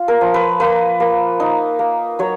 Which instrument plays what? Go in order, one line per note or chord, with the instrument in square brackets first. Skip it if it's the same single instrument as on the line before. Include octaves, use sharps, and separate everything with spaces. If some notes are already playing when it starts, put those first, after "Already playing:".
Already playing: [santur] F4
A#4
F3
B4
A#3 B4
A#3
D#4
A#3
F#3 C#5